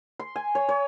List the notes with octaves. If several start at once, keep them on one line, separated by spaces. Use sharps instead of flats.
C6
G#5
C#5
C#5